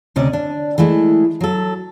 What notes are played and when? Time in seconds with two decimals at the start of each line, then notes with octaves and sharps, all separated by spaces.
0.16 D2 C3 C#4 D5 D#5
0.33 D4
0.78 E3 G#3 A3 E4
1.41 F#3 A4